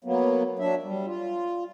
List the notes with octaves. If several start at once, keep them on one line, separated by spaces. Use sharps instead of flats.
F#3 A#3 B3
F#3 D4 E5
G3
F4